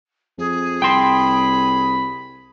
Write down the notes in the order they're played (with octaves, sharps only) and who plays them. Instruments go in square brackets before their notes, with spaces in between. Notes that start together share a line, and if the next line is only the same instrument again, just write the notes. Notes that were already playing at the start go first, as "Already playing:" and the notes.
[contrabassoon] F2 [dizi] G#4
[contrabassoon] C2 [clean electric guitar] G5 C6 [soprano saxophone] B5